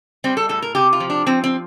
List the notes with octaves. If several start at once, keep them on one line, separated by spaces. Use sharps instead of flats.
G3 C4
A4
A2 A4
A#4
C3 G4
F4
F3
D4
F3 C4
C4